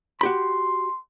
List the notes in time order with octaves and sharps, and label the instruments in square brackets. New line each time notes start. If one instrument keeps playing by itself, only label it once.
[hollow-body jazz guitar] F#4 G4 B5 [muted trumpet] C6